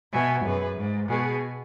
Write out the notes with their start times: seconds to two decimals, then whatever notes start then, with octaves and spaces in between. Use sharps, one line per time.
0.13 B2 E5 G#5
0.45 F#2 G#4 B4
0.77 G#2
1.09 B2 G#4